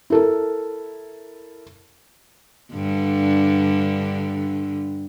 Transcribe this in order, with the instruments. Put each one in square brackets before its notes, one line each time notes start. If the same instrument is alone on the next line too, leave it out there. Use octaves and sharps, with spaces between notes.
[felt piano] E4 A4 A#4
[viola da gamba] G2 D3